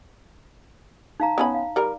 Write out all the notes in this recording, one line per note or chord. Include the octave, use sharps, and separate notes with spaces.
D#4 F5 A#5
B3 C#4 B5
F5
G3 A#4